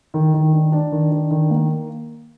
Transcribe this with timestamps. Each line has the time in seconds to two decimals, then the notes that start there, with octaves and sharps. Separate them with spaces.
0.14 D#3
0.34 D#3
0.53 D4
0.72 D4
0.92 D#3
1.12 D4
1.31 D#3
1.50 A#3